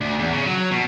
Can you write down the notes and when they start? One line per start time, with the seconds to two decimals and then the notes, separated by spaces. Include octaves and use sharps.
0.01 D2
0.19 E2
0.33 C#3
0.46 F#3
0.71 B2